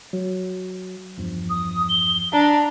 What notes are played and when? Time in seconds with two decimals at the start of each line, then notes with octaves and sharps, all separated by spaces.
0.13 F#3
1.18 E2 G2 F3
1.50 D#6
1.89 G7
2.33 D4 A#5